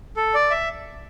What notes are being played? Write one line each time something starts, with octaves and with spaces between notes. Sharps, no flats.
A4
D5
E5